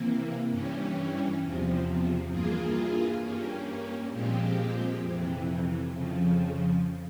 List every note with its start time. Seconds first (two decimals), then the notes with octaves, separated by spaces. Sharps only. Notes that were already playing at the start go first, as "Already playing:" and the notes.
Already playing: C3 E3 A#3
0.49 G2 E3 G3 C#4
1.41 E2 C3 F3
2.30 G2 E3 A#3 F4 G#4
3.21 G2 G3 A#3 C#4
4.10 A#2 F3 G#3 C4 G4
5.01 F2 C3 E3
5.92 F2 C#3 F3